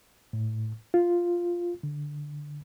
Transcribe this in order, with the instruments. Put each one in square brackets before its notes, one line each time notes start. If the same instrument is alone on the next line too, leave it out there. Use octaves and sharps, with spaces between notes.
[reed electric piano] A2
F4
D3